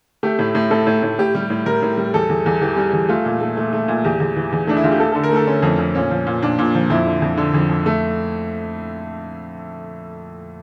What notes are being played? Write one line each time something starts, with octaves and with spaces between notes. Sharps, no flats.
A3 G4
A2
A2
A2 A4
A2
A2
A2 G4
G3
A2
G3 A#4
A2
G3
E2 A4
E2
E2
E3 G4
G3
E2
A3 F4
A#2
A3
A3
A3
A#2
E2 G4
E2
E3
E2
A3 D4
E4
E2 F4
G4
A3 A4
D3 A4
A#4
A3 A4
D3 C#4
F2
F2
A#2 C#4
F3
A#2
A#2 D4
A#2
F3
F2 E4
D3
F2
D3
F2
F2
A3